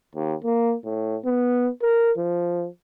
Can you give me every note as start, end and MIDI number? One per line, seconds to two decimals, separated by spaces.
0.15 0.35 39
0.44 0.75 58
0.84 1.17 45
1.25 1.70 59
1.83 2.11 70
2.17 2.67 53